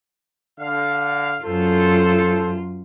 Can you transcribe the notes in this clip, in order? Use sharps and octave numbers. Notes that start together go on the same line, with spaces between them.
D3 F5
F#2 F4 A4 C5